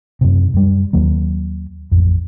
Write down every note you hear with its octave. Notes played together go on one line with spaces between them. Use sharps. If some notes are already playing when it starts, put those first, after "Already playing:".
F#2 C3
F#2 G3
D#2 F#3 A#3
A1 F2